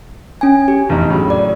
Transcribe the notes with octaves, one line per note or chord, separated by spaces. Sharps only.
C#4 G#5
G4
F1 E2 D#4
A2 C#3 F#3
D5